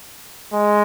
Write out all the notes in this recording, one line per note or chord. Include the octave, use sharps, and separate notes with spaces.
G#3